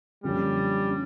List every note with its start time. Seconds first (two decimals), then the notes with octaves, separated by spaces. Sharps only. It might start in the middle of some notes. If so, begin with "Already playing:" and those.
0.24 F#2 D3 F3 G3 A#3 C#4
0.90 C#4